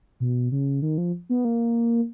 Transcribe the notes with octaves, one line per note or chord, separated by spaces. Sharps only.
B2
C#3
D#3
F3
B3
A#3